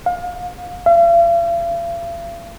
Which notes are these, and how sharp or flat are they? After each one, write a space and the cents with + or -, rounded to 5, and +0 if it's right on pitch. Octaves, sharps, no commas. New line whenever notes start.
F5 +35
F5 -45